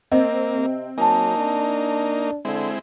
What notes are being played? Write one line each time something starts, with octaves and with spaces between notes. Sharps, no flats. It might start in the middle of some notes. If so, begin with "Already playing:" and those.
A#3 C4 D#5
C3
F#3 A#3 D#4 G#5 A5
D4
D3 G#3 C4 E4